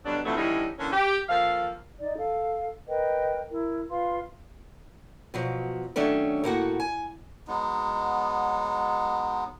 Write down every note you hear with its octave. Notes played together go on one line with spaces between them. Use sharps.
G2 B2 D3 F#3 D4
F2 D3 E3 F#3 A3
D3 E3 G3 C#4 D#4 E4
D3 E3 A#3 C#4
G4
F3 A#3 A4 F5
D#4 D5
A4 F5
A#4 B4 D#5 G5
E4 A#4
F4 B4 F5 C6
B2 F3 F#3
D#3 F#3 A3 C#4 D4
A2 A#3 F#4 F#5
G#5
F#3 G#3 B3 D#4